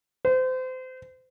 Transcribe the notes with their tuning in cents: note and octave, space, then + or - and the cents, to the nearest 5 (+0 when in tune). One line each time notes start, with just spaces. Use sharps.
C5 -30